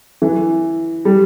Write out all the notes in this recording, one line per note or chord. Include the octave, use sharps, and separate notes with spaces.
E3
G3